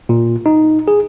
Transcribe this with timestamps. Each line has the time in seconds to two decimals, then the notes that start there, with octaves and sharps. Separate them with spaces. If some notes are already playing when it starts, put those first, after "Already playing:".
0.09 A#2
0.46 D#4
0.88 G#4